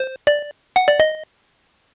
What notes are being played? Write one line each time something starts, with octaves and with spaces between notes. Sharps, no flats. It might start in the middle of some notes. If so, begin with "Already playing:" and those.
Already playing: C5
D5
F#5
D5
D#5